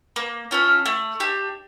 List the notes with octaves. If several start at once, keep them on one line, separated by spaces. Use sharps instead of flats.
A#3
C#4 F4 A4
A3
D4 G4